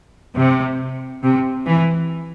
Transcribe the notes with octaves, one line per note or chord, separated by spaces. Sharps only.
C3
C3
E3